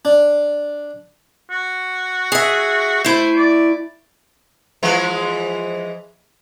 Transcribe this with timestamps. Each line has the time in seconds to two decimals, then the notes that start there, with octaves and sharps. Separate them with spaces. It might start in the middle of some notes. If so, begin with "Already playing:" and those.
0.05 D4
1.50 F#4
2.32 G#4 E5
3.05 A3 E4 C5
3.36 D5
4.83 E3 F3 G#3